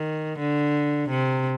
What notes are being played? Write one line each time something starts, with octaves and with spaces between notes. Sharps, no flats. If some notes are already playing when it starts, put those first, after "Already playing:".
Already playing: D#3
D3
C3